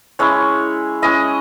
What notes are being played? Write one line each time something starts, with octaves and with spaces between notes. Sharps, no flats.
G#3 C#4 E4 C#5
G#3 C#4 E4 D#5